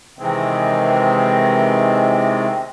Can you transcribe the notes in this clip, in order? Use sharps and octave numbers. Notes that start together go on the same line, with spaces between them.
C3 D#3 E3 G#3 C4